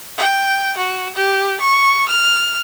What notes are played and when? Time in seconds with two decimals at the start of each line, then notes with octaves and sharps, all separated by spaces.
0.18 G5
0.77 F#4
1.16 G4
1.61 C#6
2.08 F6